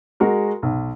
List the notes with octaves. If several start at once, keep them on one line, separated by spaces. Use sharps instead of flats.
G#3 F#4 A#4
B1